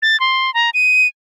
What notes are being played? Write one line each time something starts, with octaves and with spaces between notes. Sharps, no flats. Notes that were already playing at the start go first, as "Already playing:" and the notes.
A6
C6
A#5
D#7